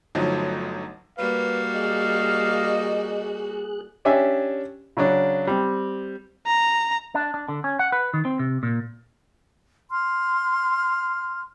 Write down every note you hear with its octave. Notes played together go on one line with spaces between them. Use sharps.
G1 D3 F3 F#3 A3 D#4
G3 A#3 F#4 B4 F5
G#4 D#5 F#6
C#4 D4 G4 E5 G#5
C#3 F#3 C#4 D4
G3 C4
A#5
D4
D4
D3
C#4
F#5
B4
D#3
C4
C3
A#2
C6 F6